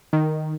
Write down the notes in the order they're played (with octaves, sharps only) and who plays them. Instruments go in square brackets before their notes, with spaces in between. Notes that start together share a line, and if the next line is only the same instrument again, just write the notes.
[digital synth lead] D#3